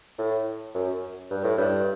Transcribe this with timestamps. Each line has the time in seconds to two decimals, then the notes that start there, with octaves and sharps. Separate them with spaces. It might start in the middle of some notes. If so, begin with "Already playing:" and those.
0.18 A2
0.74 F#2
1.30 G2
1.44 A2
1.58 G2